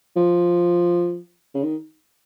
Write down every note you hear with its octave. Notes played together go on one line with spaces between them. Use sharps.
F3
C#3
D#3